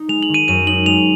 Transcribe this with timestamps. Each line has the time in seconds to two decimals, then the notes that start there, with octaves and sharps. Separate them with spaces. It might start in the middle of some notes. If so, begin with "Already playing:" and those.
Already playing: D#4
0.08 G#3 F7
0.23 F#7
0.29 D#3
0.34 D#7
0.48 F#2 D#7
0.67 D#4 F#7
0.86 G#3 F7